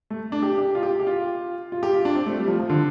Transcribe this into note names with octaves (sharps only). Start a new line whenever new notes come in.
A3
D4
G4
G4
F4
G4
G4
F4
F4
G4
F4
D4
C4
A3
G3
F3
F3
D3